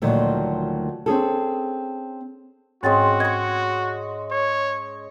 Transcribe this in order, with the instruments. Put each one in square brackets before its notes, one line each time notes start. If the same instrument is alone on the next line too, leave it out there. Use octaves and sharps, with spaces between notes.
[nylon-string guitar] D2 A#2 D#3 F3 F#3 A3
C4 C#4 G#4 A4
[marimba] G#2 A6 [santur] G#3 C4 C#4 [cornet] F#4
[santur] D#5 C#6 [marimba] G#6
[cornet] C#5